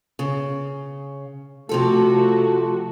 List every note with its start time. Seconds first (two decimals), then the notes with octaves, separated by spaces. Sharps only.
0.19 C#3
1.69 C3 F3 A3 F#4 A4